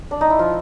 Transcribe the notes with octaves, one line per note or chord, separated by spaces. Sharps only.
D4
D#4
E4
F3 F4